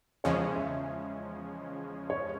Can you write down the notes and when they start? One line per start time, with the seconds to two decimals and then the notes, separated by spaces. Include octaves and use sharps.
0.24 E2 C#3 F3 G#3 C#4 C#5
0.56 E5
2.10 C#5